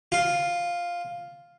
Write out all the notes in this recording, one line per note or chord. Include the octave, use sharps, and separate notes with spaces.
F4